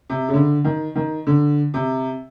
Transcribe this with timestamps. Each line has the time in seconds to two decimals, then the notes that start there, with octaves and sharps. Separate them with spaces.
0.10 C3
0.29 C#3
0.34 D3
0.65 D#3
0.96 D#3
1.27 D3
1.74 C3